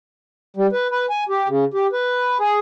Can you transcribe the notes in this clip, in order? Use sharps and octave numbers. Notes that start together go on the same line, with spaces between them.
G3
B4
B4
G#5
G4
C#3
G4
B4
G#4